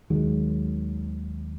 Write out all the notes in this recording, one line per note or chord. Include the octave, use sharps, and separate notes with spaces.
D#2 D#3 F#3 G#3